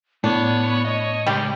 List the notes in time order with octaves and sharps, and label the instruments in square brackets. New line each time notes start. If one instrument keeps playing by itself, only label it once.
[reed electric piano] A2 [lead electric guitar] B3 [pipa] D4 [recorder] C#5
[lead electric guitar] D#5
[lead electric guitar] C#3 G#3 [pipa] G3 G4